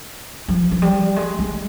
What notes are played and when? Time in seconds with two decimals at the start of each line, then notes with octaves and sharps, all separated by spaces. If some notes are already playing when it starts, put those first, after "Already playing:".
0.48 F3
0.71 F3
0.82 G3
1.16 G#3
1.39 G#3